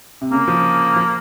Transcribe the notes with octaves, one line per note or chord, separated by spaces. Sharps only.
C3
C#3 A#3
F3
F3